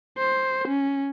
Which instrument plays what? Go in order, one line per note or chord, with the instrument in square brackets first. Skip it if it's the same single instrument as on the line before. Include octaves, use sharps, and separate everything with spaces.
[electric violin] C5
C#4